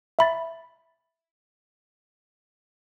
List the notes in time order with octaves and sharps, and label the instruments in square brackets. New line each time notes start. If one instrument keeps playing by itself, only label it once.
[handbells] E5 B5 A6